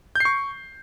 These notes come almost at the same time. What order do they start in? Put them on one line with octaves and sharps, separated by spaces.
G6 C7 C#6